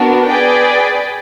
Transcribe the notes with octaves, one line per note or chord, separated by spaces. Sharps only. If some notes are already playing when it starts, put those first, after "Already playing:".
Already playing: B3 D4 F#4 A#4
G#4 B4 D5 G5